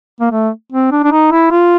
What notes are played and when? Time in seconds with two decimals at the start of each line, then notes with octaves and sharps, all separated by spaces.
0.21 A#3
0.31 A3
0.72 C4
0.91 D4
1.04 D4
1.11 D#4
1.32 E4
1.51 F4